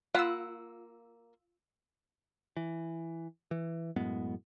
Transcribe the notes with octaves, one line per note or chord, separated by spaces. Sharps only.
A#3 F4 F#5 B5 E6
E3
E3
F#2 A2 G#3 B3